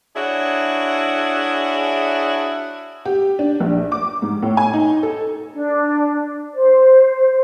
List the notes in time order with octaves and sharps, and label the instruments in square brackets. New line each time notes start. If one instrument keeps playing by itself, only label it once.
[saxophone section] D4 E4 F#4 G#4 C#5
[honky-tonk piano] G4
D4
A#1
D6
G#2
A2
G#5
D#4
A4
[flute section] D4
C5